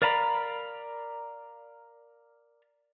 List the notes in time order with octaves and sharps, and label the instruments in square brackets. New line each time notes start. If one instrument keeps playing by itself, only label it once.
[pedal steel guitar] A#4 D5 F5 A#5 B5